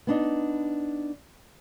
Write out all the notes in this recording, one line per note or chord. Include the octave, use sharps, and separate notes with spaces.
B3 D4 D#4